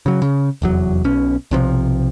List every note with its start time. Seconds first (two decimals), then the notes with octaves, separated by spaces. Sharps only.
0.06 C#3 F#3
0.22 C#3
0.62 F1 E2 F#3
1.04 B1 B2 C#4
1.51 B1 C3 E3 F3